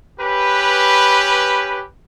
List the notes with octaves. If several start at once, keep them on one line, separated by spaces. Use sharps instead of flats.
C#4 G4 B4